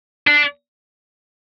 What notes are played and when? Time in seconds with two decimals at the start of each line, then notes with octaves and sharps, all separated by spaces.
0.27 D4